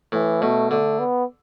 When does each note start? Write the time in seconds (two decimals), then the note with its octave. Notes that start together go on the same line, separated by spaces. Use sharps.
0.12 A2 E3
0.42 B2 A3
0.71 D3 A3
0.99 B3